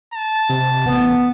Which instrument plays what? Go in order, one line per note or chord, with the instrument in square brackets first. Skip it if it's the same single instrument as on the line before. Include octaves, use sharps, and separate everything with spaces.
[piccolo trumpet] A5
[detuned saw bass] C3
[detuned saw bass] A1 [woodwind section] B3